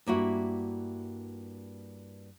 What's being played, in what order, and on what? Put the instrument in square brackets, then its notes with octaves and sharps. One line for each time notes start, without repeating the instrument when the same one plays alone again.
[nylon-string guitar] G2 A#3 E4 F#4